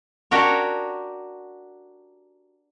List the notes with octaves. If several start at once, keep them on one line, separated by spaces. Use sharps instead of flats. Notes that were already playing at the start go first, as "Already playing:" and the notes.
D4 F#4 G4 A#4 C#5